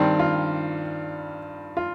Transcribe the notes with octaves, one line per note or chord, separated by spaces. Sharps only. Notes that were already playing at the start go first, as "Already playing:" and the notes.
Already playing: G2 D#3 G3 C4
F4
F4